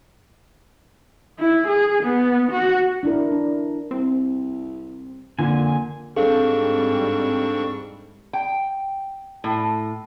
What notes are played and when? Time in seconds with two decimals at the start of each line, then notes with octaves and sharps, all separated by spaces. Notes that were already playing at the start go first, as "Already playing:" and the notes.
1.39 E4
1.68 G#4
2.03 B3
2.52 F#4
3.03 D4 E4 A#4
3.32 D4
3.91 C2 C4
5.39 F2 A#2 D3 G#5
6.16 G#2 G3 C4 D4 G#4 A4 F5 C#6
8.33 G5
9.44 A2